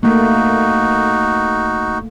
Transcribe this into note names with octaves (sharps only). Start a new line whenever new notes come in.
A3 A#3 D#4 F#4